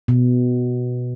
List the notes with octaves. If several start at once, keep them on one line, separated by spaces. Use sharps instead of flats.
B2